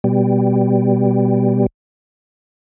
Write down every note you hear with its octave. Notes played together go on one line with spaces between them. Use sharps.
B2 G3